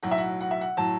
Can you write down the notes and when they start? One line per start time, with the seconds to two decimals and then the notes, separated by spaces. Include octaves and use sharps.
0.03 B1 A2 F#3 F#5
0.11 E5
0.18 F#5
0.41 F#5
0.51 E5
0.61 F#5
0.77 A2 F#3 A5